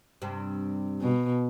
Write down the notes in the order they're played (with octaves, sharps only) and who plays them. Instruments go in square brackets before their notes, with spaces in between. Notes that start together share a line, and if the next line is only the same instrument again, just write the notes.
[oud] G2 C3
[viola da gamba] B2